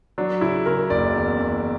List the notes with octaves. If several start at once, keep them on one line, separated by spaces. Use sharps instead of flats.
F#3 D4
C#3 E4
C#3 A#4
F#1 D5
E2
E2